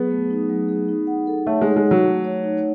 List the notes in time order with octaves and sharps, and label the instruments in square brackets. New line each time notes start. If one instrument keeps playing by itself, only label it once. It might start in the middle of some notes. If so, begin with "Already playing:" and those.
Already playing: [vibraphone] F#3 G#4 [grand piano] B3
[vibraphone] A3
D#4
F#3
G#4
D#4
F#5
A4
[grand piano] A3 [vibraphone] C#5
[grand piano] G#3 [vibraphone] D#4
[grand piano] G#3
[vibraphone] F#5
[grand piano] F#3
[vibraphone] A3
C#5
D#4